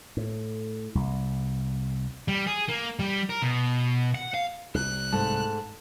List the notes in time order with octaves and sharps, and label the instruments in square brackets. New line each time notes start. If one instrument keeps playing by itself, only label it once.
[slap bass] A2
C2
[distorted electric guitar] G3
G#4
A#3
G3
A#4
B2
F#5
F5
[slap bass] C2 [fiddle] F#6
[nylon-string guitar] G#2 A3 [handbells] A5